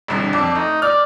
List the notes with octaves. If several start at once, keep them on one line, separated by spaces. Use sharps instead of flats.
E1 C2 D3
F2 D4
A3 D#4
D5 F6